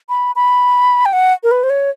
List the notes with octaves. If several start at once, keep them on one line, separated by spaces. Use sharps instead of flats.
B5
B5
G5
F#5
A#4
B4
C5
C#5